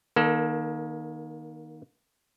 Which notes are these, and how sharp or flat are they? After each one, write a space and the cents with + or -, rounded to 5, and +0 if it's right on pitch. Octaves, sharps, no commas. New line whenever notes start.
D#3 +0 A#3 +30 A4 +0